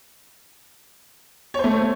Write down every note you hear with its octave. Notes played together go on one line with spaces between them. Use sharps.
A3 C5 C#5